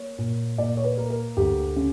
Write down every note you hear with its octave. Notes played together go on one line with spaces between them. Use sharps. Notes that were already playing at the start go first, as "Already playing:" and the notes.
Already playing: A#3 C#5
A#2
A#2 D5
C#5
B4
A#3
A#4
D2 G4
C#3